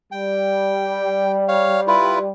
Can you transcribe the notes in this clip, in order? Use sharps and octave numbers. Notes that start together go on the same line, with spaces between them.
G3 G5
C#5 F5
E4 F4 B4